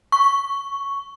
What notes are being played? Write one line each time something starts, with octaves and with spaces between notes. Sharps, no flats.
C#6